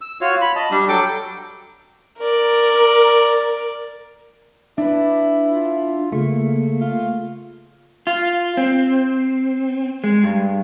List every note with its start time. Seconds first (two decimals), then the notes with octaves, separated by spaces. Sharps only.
0.01 E6
0.21 F4 F#4 C#5
0.41 B5
0.56 D#5 A5
0.71 G3 D4
0.89 F#3 A4 G5 D6
2.18 A#4 D5
4.78 D4 E4 B4
5.51 F4
6.12 C#3 A3 A#3
6.81 F4
8.07 F4
8.57 C4
10.04 G#3
10.23 G2